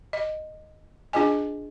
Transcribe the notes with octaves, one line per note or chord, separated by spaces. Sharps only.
D#5
D4 F4 G#4 D#5 G#5